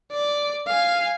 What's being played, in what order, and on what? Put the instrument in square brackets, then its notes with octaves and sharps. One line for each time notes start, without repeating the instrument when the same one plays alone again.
[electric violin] D5
F5 G#5